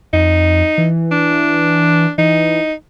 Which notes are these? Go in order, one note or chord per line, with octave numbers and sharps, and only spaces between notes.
F2 D#4
E3
D4
E3 D#4